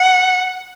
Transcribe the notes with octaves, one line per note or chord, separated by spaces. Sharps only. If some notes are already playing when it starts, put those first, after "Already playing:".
Already playing: F#5